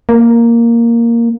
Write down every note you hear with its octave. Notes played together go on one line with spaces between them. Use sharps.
A#3